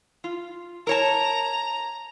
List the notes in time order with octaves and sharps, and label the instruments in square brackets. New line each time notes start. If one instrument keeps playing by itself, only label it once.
[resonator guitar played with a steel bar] F4
[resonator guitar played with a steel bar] A#4 C#5 A5 [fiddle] A#5